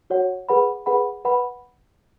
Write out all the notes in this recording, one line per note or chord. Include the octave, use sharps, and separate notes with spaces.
F#4 C#5 F#5
G#4 B4 F#5 B5
G#4 B4 F#5 B5
B4 F#5 B5